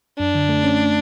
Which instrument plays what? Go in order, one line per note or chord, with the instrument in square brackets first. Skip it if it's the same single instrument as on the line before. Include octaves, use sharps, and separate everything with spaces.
[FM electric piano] F#2 [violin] D4
[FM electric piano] D3
A3
C#4